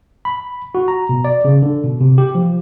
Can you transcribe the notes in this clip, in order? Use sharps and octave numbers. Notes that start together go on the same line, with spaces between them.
B5
F#4
A#5
B2
D5
C#3
D3
B2
C3
G4
F3